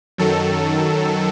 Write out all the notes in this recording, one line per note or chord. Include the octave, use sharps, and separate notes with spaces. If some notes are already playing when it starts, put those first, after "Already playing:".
F#2 D#3 F#3 A4